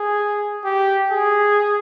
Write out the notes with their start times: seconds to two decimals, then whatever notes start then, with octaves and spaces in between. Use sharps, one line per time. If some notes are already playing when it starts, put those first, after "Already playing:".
Already playing: G#4
0.64 G4
1.11 G#4